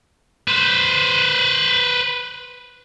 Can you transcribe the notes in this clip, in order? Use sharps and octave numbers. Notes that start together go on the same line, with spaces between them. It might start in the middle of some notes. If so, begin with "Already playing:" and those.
B4 C5